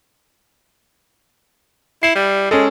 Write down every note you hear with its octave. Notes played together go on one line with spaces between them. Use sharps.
E4 C7
G3
G#3 C#4 A4